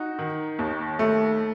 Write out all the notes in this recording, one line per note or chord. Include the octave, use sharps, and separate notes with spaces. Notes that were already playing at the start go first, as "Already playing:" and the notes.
Already playing: D#4 F#4
D#3
D#2
A3